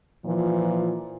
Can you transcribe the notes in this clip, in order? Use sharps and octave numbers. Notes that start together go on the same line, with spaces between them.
A#2 E3 F3